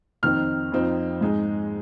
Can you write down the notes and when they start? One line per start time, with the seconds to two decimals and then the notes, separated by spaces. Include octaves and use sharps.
0.23 F2 D#3 C4 D#4 F6
0.72 F2 F3 C4 D#4
1.21 G#2 G#3 D#4